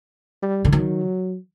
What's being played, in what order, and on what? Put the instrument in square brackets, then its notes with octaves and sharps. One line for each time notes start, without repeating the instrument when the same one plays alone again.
[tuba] G3
[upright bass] D3
[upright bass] D#3 [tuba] F#3